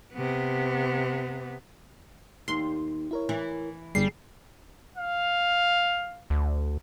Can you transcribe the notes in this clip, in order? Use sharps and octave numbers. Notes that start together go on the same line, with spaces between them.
C3 B3
D#2 C6
E4 A#4 C#5
E3
G1 G3 G#4 C7
F5
D2